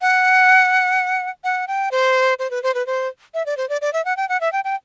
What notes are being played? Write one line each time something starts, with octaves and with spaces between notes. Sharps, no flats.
F#5
F#5
G5
C5
C5
B4
C5
B4
C5
E5
D5
C5
D5
D5
E5
F#5
G5
F#5
E5
G5
G5